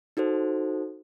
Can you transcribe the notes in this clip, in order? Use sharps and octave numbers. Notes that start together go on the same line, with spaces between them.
D#4 F#4 A4 C5